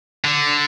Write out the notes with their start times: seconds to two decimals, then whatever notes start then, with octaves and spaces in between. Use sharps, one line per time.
0.24 D3